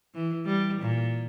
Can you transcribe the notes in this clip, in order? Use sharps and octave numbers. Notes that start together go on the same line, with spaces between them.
E3
G3
A#2